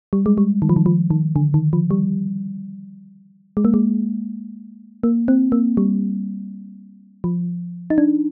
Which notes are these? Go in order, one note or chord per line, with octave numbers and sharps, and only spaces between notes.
G3
G#3
G3
D#3
F3
D#3
F3
D#3
D3
D#3
F3
G3
G#3
A#3
G#3
A#3
C4
A#3
G3
F3
D#4
D4